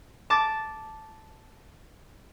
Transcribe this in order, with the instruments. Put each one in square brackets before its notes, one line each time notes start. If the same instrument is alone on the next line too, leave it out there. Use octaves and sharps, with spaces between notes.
[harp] A5 D6 A6